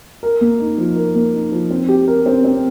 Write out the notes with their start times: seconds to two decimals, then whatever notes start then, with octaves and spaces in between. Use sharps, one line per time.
0.23 A#4
0.41 A#3
0.59 D#4
0.78 F3
0.96 A#4
1.15 A#3
1.34 D#4
1.52 F3
1.70 C4
1.89 G4
2.08 A#4
2.26 C4
2.44 C4